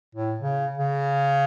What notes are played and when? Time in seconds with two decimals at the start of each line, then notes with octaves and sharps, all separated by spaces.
0.15 A2
0.40 C#3
0.78 C#3